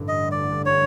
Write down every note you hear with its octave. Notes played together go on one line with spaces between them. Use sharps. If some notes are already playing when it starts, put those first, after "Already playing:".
Already playing: A1 G2 D3
D#5
D5
C#5